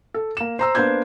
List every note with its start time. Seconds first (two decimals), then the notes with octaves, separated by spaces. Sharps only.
0.14 A4
0.37 A#3 E7
0.59 C5 A#5 E6
0.75 A#3 B3 D4 C5 G6 G#6